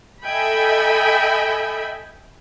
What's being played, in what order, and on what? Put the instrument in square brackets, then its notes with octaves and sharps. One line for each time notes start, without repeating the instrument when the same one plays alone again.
[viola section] A4 D#5 E5 G5 G#5 B5